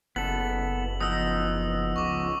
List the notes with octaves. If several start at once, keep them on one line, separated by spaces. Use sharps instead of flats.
F#1 B3 A4 F#7
F3 B3 D#4 D#6 E6
C#2 C#6 D6